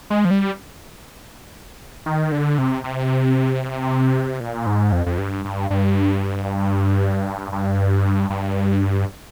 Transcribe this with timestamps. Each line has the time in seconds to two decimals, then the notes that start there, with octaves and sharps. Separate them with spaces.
0.10 G#3
0.25 F3
0.31 G3
2.06 D#3
2.32 D3
2.58 C3
2.84 C3
4.40 A#2
4.66 G#2
4.92 F2
5.06 F2
5.18 G2
5.45 G2
5.70 G2
7.52 G2
8.30 G2